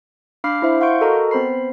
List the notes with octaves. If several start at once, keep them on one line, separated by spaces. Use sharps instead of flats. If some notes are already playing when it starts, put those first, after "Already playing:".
D4 F5 B5 D6 F6 C7
E4 C5 E5
F5 F#5 C6 C#6 G6 D7
F#4 A4 A#4 D#5 A#5
B3 C4 C5 B5 C7